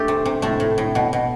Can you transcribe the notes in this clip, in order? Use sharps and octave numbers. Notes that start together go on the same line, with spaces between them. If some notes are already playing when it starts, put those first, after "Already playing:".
Already playing: A3 D4 G4
C3
C3
A2 A3
A2
A2
B2
B2